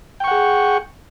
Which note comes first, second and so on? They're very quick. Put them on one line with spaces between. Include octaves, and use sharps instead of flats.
G5 C#6 F#5 G#4